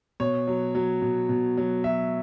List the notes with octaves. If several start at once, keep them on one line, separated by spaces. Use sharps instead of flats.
B2 C#5
F#3
F#3
B2
B2
F#3
F#3 E5